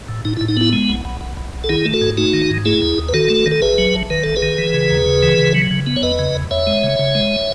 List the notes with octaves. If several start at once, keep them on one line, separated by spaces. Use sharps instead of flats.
A2
A2 D#4
E4
A2
D#4
B3 E4
G#3
B1
B1
B1
B1
B1
A4
D#3 E4 G#4
A3
F#4 A4
G#2
A3 D#4 F#4
D#3
G#2
A3 E4 G#4
D#2
D#2
B4
D#3 F#4 A4
A3
D#3
A4
A1 G#4 B4
F#3
A1
D#3 B4
A1 A4
G#4 B4
D#3
E3
C#3
D#2
C#3
E3
C#3
F#3
C#3
B3
C#5
E2 B4 D#5
C#3
E2
E2 C#5 E5
G#3
C#3
C#3
G#3